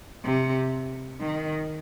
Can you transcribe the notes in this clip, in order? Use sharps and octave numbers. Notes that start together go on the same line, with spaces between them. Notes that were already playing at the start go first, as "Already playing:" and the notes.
C3
D#3